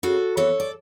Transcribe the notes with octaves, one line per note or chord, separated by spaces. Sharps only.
C#3 F#4 A4
E3 B3 A4 C#5
D5